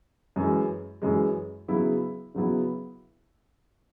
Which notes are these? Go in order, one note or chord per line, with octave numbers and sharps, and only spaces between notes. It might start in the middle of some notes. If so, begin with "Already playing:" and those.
F#2 E3 G#3
F#2 E3 G#3
C#3 F#3 B3 E4
C#3 F#3 B3 E4